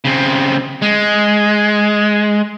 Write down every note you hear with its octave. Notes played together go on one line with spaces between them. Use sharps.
C#3 C4
G#3